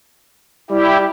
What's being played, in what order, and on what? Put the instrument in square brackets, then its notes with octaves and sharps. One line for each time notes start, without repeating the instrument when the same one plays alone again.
[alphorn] G3 [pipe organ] E4 G4